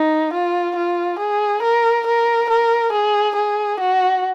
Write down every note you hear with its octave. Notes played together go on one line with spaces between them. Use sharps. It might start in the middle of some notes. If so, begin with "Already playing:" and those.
Already playing: D#4
F4
F4
G#4
A#4
A#4
A#4
G#4
G#4
F#4